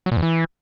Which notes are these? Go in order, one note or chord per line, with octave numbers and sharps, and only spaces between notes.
F#3
A#2
E2
E3